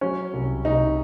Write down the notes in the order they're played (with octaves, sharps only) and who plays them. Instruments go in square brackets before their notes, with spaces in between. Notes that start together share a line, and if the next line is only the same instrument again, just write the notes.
[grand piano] F#3 [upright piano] C#4
[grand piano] C2
[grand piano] C2 [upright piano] D#4